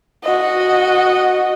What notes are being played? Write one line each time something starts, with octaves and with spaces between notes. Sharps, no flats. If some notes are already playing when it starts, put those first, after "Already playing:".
F#4 D#5